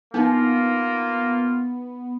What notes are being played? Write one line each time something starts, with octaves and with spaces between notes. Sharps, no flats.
A#3 B3 D4 D#4 F4